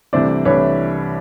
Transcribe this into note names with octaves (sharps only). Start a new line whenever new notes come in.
C2 C3 E3 A3 D4 C5 D5
C2 C3 E3 A3 D4 B4 C#5